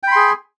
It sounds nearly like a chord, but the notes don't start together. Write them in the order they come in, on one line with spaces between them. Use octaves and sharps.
G5 B5 C6 G#4